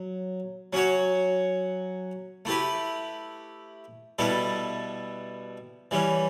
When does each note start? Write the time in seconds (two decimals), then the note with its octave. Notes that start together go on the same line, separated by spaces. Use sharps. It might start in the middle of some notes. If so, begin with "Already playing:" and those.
Already playing: F#3
0.73 F#3 C#4 F#4 C#5
2.45 A3 E4 G4 B4
4.19 B2 G3 B3 E4 A4
5.91 E3 G3 C#4